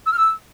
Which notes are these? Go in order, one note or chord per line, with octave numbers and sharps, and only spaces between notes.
E6
F6
E6